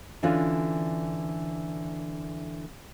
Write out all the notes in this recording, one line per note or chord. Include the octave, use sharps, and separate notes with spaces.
D3 E3 C#4 D4 F4